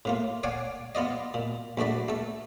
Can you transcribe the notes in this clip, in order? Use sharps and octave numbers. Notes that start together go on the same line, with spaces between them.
A2 A#3 F4
C#5 D5 F5 F#5 G#5 D6
B3 F4 D5 D#5
A#2
A#1 A3 F#4 D5 B5
A3 A4